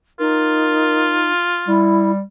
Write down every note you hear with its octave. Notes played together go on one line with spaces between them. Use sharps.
D#4 F4 A#4
G3 E4